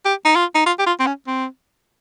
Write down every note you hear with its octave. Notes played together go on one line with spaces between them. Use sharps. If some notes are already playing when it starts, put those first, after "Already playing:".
G4
D#4
F4
D#4
F4
G4
F4
C4
C#4
C4